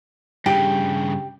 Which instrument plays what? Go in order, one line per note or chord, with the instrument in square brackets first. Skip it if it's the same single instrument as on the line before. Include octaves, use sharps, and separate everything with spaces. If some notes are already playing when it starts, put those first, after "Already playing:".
[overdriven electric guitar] G2 C#3 [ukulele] G4